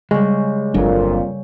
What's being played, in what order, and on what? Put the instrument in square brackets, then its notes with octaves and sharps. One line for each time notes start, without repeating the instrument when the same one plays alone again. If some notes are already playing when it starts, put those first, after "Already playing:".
[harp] C#3 G3 [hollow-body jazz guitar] G#3
[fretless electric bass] G1 F#3 D4 [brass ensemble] F2 A#2